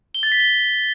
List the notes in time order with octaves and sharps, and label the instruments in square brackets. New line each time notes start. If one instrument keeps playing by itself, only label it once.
[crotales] G7
A6
B6
G7